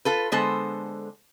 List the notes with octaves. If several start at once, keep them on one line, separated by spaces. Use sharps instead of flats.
F4 A4 B4
D3 G#3 B3 A4 C5